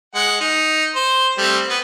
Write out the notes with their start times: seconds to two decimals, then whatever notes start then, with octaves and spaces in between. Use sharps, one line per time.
0.15 G#3 F#5
0.41 D#4
0.96 C5
1.38 G3 A3 C4
1.69 B3 B4